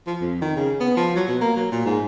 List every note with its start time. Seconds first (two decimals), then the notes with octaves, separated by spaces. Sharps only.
0.07 F3
0.21 F2
0.42 D#3
0.56 C#3
0.80 B3
0.97 F3
1.16 F#3
1.28 B2
1.41 A#3
1.56 F#3
1.72 A#2
1.85 G#2